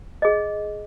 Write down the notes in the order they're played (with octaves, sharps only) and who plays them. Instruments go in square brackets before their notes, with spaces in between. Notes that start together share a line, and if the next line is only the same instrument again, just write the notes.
[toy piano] G#4 D#5